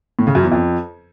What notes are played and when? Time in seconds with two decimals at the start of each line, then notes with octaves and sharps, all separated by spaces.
0.19 A2
0.27 C#3
0.35 F#2
0.43 E2
0.52 F2